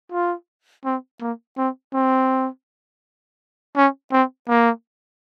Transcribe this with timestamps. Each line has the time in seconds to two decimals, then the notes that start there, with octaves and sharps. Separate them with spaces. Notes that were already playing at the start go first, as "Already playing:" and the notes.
0.12 F4
0.85 C4
1.21 A#3
1.58 C4
1.94 C4
3.76 C#4
4.12 C4
4.48 A#3